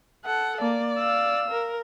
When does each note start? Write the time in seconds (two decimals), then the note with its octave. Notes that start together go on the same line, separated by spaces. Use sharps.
0.25 A4 F#5
0.61 A#3 D5
0.98 F5 E6
1.50 A#4